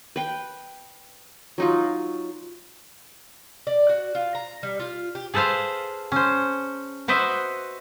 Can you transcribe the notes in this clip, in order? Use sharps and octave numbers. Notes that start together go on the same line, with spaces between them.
B4 G5
F#3 D#4 F4
D5
F#4
F4
A#5
G3
F4
G4
G#4 A4 B4 C5 F5
C#4 C5
F#4 B4 C5 D#5 E5